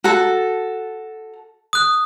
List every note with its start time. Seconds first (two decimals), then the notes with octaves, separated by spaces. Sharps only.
0.04 F#4 A4
1.73 D#6 F#6